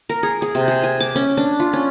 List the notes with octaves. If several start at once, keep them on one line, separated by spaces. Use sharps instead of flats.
A#4
G#4
G#4
C3
G#4
G#5
D6
C#4
D4
F4
C#4